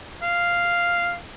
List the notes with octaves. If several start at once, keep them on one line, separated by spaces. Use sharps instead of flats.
F5